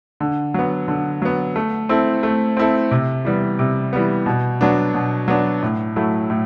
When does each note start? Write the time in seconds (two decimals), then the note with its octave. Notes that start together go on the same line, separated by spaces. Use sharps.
0.20 D3
0.54 F#3 B3
0.88 D3
1.22 F#3 B3
1.56 A3
1.89 C4 E4 A4
2.23 A3
2.57 C4 E4 A4
2.91 C3
3.25 E3 G3 B3
3.59 C3
3.93 E3 G3 B3
4.26 B2
4.61 F#3 B3 D4
4.94 B2
5.28 F#3 B3 D4
5.62 A2
5.96 F#3 A3 E4
6.30 A2